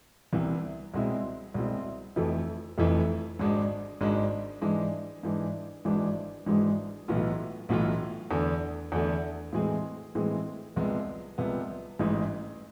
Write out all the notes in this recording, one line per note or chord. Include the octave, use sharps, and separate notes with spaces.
C2 C3 E3 B3
C2 B2 G#3 C4 E4
C2 B2 G#3 C4 E4
F1 F2 E3 A3 E4
F1 F2 E3 A3 E4
G#1 G#2 G#3 D4
G#1 G#2 G#3 D4
G#2 E3 G#3 D4
G#2 E3 G#3 D4
G#1 G#2 E3 G#3 D4
G#1 G#2 E3 G#3 D4
B1 A2 E3 B3 F4
B1 A2 E3 B3 F4
E2 D3 A3
E2 D3 A3
A2 E3 G#3 C4 G#4
A2 E3 G#3 C4 G#4
C2 C3 F3 G#3 B3
C2 C3 F3 G#3 B3
A1 G#2 E3 G#3